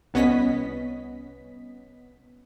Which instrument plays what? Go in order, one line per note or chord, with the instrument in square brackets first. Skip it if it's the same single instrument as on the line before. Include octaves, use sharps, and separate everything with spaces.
[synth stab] C2 B3 C#4 D#5 B6